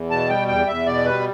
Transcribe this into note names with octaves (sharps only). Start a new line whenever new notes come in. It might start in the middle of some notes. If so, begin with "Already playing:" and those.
Already playing: E2
B2 A5
G3 G5
E2 G5
E2 E5
B2 D5
G3 B4